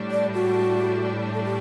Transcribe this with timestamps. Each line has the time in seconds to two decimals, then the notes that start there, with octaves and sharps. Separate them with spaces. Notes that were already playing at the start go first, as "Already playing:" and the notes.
Already playing: A2 G3 D4
0.11 D5
0.34 F#4
1.33 A4
1.44 G4